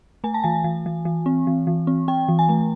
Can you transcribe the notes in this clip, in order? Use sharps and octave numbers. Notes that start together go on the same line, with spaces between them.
A3 G#5
A5
E3 G#5
E3
E3
E3
C4
E3
E3
C4
C4 G5
E3
G#5
A3